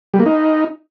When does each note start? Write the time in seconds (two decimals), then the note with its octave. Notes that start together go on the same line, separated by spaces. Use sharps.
0.14 G3
0.20 A#3
0.26 D#4